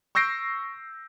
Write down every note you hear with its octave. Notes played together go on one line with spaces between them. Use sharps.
C#6 E6 G6 A#6 C7 D7